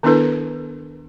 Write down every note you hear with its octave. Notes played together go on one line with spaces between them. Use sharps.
D#3 B3 D4 E4 A4 B4